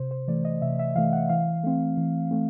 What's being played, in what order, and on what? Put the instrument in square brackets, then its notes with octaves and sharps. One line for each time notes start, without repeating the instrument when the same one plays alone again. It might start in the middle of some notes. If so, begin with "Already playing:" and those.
Already playing: [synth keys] C3 C5
C5
E3 A3 D5
D#5
C3 E5
E5
E3 A3 F5
F#5
E3 F5
A3 C4
E3
A3 C4